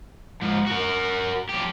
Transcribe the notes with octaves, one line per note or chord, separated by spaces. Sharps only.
G#2 F3
F#4 A#4
F3 G4